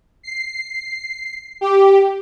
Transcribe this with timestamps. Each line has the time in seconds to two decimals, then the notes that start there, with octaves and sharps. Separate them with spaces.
0.23 C7
1.61 G4